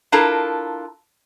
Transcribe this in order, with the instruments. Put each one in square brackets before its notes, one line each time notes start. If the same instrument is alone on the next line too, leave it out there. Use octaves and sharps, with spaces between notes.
[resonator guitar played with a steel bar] D4 E4 F4 A4 A#4 A#5